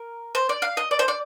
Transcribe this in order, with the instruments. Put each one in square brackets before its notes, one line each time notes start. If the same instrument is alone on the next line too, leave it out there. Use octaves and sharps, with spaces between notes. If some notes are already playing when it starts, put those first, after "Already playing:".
Already playing: [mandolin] A#4
C5
D5
F5
D#5
D5
C5
D5